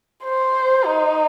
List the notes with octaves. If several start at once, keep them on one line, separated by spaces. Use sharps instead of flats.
C5
D#4